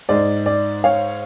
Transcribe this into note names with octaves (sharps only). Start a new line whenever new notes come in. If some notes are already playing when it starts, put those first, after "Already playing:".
G#2 G#3 D5
D5
C#5 F5